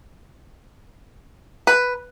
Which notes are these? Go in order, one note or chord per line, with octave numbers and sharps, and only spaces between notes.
B4